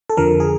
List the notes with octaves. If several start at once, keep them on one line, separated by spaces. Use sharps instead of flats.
A4
F2 D3 F3 A#4
G#4